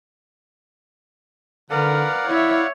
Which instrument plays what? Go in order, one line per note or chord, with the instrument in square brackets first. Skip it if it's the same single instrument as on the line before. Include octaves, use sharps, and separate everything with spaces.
[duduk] D3 [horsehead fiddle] A#4 B4 [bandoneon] D5 F5 F#5
[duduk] E4 [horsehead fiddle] C#5 E5